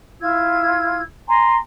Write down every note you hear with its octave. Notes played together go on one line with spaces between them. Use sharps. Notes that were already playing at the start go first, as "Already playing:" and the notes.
E4 F4 E6 G#6
G#5 A#5 C6